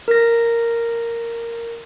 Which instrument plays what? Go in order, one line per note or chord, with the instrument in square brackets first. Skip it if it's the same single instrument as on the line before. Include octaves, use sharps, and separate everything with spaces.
[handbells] A#4 A#6